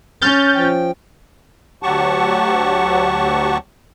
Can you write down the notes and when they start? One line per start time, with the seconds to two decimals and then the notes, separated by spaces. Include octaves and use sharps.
0.22 C#4 F6 G6 A6
0.55 F3 G5
1.83 D2 F#3 G4 F#5 A5 C#6